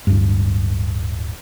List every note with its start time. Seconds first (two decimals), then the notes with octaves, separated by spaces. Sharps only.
0.07 D1 G2